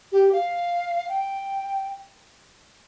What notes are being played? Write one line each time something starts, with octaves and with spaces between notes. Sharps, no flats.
G4
F5
G5